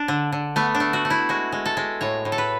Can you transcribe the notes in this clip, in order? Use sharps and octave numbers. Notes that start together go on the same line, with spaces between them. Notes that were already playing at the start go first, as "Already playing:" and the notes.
Already playing: D4
D3
D3
A3 B3
D4
A3
F#4
A3
E4
G#3 F#4
G#3
A4
G#3
A2 C#5
A2
A4
B4